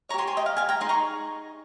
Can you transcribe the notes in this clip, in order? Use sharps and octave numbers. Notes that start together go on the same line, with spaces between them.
G4 C#5 G#5 A#5 C6 C#6
G#5 C6
D#5 G5
F5
F5 G#5
G5 A#5
D#4 G#4 D#5 G#5 C6
A#5 C#6